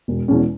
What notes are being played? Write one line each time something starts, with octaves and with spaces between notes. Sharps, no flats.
E1
E2 B2 G#3 C#4